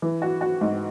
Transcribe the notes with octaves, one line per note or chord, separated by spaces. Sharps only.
E3
F#4
F#4
G#2